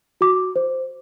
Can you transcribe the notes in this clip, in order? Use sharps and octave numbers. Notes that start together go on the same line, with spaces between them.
F#4 D6
C5